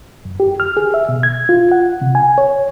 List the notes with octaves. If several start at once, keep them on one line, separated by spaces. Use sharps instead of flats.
F#2
G4
F6
G#4
E5
B2
G#6
F4
F#5
C3
G#5
C#5